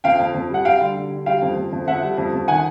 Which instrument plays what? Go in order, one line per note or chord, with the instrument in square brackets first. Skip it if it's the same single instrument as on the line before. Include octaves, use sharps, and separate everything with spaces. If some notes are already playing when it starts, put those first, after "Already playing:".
[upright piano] F2 F5 G5
F2
F2
G3 F#5
G3 F5 G5
D3
G3
D3
G3 F5 G5
F2
F2
F2
F2 E5 F#5
G3
F2
F2
D#3 F#5 G#5